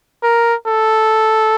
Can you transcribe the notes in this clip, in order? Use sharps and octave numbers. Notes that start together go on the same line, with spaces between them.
A#4
A4